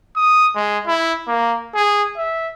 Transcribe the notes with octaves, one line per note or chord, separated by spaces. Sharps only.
D#6
G#3
E4
A#3
G#4
E5